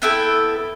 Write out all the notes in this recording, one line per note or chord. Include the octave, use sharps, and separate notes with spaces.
B3 E4 A4 E5 G5